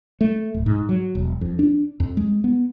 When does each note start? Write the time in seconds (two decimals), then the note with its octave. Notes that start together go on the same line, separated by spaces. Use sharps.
0.21 A3
0.54 D1
0.66 G#2
0.89 F#3
1.15 E1
1.41 F2
1.59 D4
2.00 F2
2.17 G#3
2.44 B3